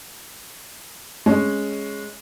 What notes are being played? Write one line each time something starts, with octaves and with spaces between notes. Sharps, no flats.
G#3 C#4